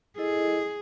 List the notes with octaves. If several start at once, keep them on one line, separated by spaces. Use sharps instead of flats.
E4 G#4 A4 D#5